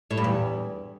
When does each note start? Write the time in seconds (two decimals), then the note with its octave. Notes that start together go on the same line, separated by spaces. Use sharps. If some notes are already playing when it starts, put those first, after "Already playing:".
0.11 A2
0.17 G2
0.24 E2